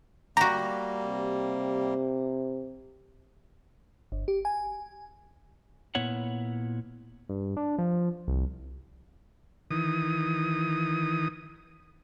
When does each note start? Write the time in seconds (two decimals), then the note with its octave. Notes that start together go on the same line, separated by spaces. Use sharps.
0.37 G3 A#3 F#4 G4 A#5
1.03 C3
4.12 G1
4.28 G4
4.45 G#5
5.95 A#2 B3 E4 C#5 F#5
7.29 G2
7.57 D4
7.78 F3
8.28 C2
9.71 D#3 E3 D#6